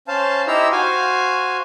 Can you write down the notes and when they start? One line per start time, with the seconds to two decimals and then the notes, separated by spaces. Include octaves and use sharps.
0.08 C#4 C5 F5 A5
0.47 D#4 E4 G4 C5 A#5 E6
0.72 F#4 C5 F5 G#5